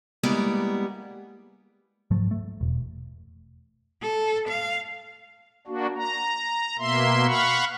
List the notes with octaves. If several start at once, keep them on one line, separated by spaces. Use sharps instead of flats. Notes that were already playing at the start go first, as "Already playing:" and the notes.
G3 G#3 A#3 B3 E4
G#2 F3 F#3 A3
A3
E1
A4
F5
A#3 D4 F#4
A#5
B2 A#3 E5 C6
F5 F#5 B5 C#6